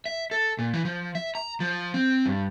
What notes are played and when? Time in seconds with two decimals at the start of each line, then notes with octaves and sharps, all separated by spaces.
0.06 E5
0.31 A4
0.59 A#2
0.74 E3
0.85 F3
1.15 E5
1.35 A#5
1.60 F3
1.94 C4
2.26 G2